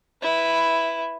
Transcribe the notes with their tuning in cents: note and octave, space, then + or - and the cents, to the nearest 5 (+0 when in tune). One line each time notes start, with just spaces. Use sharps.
E4 +0 B4 +0